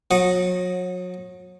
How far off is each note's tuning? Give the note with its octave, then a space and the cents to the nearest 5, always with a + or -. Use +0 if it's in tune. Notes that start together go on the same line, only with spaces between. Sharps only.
F#3 -35 D#5 +0 F#5 -20